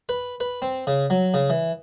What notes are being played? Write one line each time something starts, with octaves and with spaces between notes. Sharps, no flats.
B4
B4
C4
C#3
F#3
C#3
E3